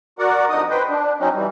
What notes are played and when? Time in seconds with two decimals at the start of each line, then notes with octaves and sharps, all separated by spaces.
0.19 F#4 A#4 D5 F#5
0.50 F2 D3 D#4 D#5 D#6
0.70 B4 C5 G5
0.89 D4
1.20 F#3 C4 C#4 D#4
1.34 E3 G3